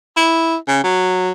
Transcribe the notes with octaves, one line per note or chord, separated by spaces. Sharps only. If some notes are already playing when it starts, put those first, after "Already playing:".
E4
C#3
F#3